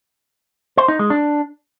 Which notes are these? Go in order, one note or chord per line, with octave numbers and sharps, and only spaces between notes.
C5
D#4
G#3
D4